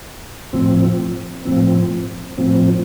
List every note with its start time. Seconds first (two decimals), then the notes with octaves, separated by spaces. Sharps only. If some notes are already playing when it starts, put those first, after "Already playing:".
0.53 A2 F3 C4
1.45 A2 F3 C4
2.38 A2 F3 C4